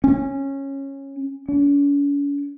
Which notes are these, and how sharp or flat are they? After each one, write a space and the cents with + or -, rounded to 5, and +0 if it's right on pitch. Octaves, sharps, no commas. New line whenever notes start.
C#4 -15
C#4 +45